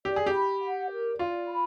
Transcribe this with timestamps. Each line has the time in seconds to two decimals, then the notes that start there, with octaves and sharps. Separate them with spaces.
0.05 G4 D5
0.16 G#4
0.26 G4
0.34 B5
0.62 F#5
0.91 A#4
1.19 F4 D5
1.47 B5